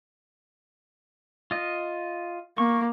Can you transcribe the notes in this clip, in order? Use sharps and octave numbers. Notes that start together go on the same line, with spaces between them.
F4 D#5
A#3 C#6